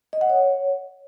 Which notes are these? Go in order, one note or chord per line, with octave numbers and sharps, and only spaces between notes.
D#5
F#5
C#5